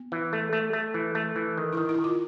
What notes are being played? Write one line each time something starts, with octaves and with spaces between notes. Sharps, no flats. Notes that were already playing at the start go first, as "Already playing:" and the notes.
Already playing: B3
E3
A3
A3
A3
E3
A3
E3
D#3
D#3 E4
E4
D#3
F4